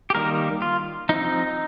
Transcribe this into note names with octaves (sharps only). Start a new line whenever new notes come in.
G4
D#3 G3 A#3 A#4
F4
F3 C4 D#4